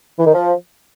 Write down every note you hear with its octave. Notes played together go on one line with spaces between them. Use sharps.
E3
D#3
F3